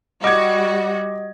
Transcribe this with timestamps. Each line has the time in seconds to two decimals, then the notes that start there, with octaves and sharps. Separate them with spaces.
0.24 G3 F#4 D#5 D6 G#6